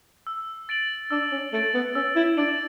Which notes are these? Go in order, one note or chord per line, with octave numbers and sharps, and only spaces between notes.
E6
A6 D7 F#7
D4 E6
C#4
A3 A6 D7 F#7
B3
C#4 E6
E4
D4 A6 D7 F#7